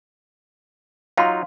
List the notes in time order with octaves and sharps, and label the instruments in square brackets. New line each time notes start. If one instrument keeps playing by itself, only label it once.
[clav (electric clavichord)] F#3 D#4 F4 [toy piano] F5 C6